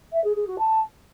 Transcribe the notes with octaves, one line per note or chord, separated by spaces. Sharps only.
E5
G#4
G#4
F#4
A5